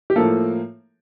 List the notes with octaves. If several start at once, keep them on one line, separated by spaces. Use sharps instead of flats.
G4
A2 F3 A#3 A4